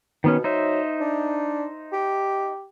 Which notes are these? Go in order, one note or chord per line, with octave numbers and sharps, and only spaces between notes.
B2 D#3 B3 C#4
F#3 D#4 C5 E5
D4
G4